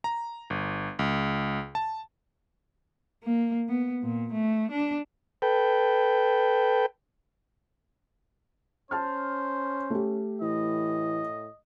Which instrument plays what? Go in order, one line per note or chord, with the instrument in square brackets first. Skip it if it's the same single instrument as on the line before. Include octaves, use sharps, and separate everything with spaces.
[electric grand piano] A#5
G1
C#2
A5
[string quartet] A#3
B3
A#2
A3
D4
[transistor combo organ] A4 B4 G5
[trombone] C#4 [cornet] C5 [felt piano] A5 F6
[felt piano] A3 G4
[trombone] A2 [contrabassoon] E3 [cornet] D#5